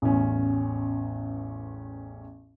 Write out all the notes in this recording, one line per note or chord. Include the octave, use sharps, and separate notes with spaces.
A1 E2 C#4